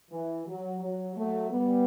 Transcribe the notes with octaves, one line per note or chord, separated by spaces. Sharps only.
E3
F#3
F#3
F#3 A3
G3 B3